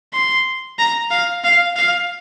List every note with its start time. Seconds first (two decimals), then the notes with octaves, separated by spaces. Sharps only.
0.13 C6
0.79 A#5
1.11 F5
1.44 F5
1.76 F5